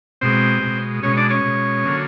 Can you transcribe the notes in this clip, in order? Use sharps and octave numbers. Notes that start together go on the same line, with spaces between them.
B2 G#3 C4 C5
B2 G#3
B2 G#3 C#4 C#5
D4 D5
C#4 C#5
B2 G#3
D3 F#3 A#3